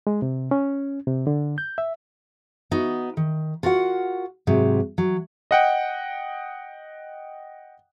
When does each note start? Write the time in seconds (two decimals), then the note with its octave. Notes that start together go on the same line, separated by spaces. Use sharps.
0.07 G#3
0.22 C3
0.51 C#4
1.07 C3
1.27 D3
1.58 G6
1.78 E5
2.71 B3 D#4 F#4
3.17 D#3
3.63 F4 F#4 A#4 E5 F#5
4.47 G#2 C3 F#3
4.98 F#3
5.51 D#5 F#5 G5